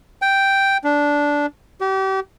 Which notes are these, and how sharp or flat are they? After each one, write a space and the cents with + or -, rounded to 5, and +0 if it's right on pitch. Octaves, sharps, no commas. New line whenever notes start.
G5 +0
D4 -10
G4 -35